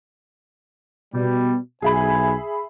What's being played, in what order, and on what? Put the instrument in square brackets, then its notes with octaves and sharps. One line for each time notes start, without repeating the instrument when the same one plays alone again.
[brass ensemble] B2 G3
[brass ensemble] B1 G#5 [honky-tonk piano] G#4 E5 B5